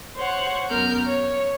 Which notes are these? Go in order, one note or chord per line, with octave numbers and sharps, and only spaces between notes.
C5 C#5 F#5
F#2 B3 A#4 F6 G6
C#5